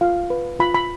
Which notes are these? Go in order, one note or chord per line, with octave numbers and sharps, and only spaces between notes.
F4 F5
B4
F4 B5
B5